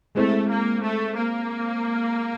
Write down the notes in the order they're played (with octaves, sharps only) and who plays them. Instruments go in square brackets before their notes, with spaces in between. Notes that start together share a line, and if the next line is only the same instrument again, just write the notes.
[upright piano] G#3 C4 E4 [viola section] A3
[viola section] A#3
A3
A#3